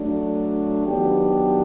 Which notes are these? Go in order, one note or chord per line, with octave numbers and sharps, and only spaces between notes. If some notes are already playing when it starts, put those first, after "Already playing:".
Already playing: F#3 A3 D4
D#3 F#3 B3 D4 G4